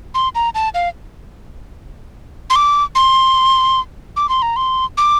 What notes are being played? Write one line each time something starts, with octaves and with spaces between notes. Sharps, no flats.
C6
A#5
A5
F5
C6
D6
C6
D6
C6
A#5
C6
D6